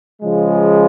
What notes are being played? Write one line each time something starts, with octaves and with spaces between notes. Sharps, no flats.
C#3 F3 G#3